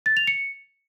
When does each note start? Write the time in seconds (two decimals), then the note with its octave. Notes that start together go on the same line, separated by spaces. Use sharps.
0.06 A6
0.17 F7
0.27 C#7